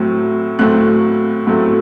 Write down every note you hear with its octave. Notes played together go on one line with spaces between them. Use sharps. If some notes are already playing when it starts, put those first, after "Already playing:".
Already playing: A2 F#3 A3 C4
A2 F#3 A3 C4 F#6
A2 F#3 A3 C4